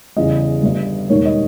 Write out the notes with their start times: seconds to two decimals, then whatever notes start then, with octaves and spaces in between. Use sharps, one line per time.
0.16 E2 C#3 E3 G3 D#5
0.63 G1 G2 G3
1.10 E1 D#2 D#3 G3 C#5
1.25 D#5